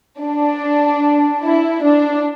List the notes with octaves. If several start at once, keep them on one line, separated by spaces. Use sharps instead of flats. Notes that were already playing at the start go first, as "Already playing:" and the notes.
D4
E4
D4